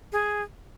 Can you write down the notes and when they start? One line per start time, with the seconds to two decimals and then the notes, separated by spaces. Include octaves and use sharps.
0.12 G#4